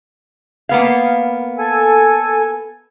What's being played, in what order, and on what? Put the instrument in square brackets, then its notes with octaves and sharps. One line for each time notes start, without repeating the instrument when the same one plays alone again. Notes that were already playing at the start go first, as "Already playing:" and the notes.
[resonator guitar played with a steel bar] A#3 B3 F5
[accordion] A4 G#5